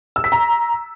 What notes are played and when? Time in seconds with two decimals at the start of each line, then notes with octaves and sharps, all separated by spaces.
0.16 E6
0.24 B6
0.32 A#5